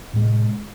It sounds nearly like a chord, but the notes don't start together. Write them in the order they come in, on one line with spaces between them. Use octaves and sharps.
A2 G#3 C3